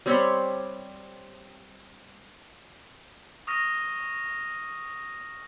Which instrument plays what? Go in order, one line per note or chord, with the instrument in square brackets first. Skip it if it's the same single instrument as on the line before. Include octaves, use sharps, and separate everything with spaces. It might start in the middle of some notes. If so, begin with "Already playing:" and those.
[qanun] G3 C4 C#5 B5
[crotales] C#6 D#6 F6 A#6 D#7